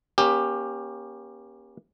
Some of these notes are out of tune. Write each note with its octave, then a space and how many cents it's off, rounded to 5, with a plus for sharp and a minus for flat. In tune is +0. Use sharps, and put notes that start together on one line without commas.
A#3 +40 C#4 +0 G4 +15